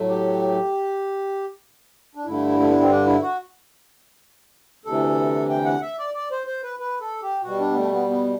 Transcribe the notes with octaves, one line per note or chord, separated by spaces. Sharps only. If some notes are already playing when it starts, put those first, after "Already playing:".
Already playing: A2 F#3 A3
G4
D4
G2 D3 A3 E4
A3
B3
C4
D4
E4
F#4
D2 C3 E3 A4
G5
F#5
E5
D5
D5
C5
C5
B4
B4
A4
G4
B2 G3 F#4
D4
B3
A3
B3
B3